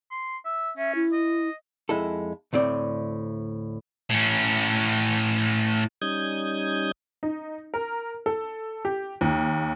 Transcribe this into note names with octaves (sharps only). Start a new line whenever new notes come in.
C6
E5
C#4 E5
E4
D#5
F2 G#3 E4 A4
D2 A2 C4 D5
A2 C#4
G3 C#4 D#4 D#6 G6 G#6
D#4
A#4
A4
G4
D#2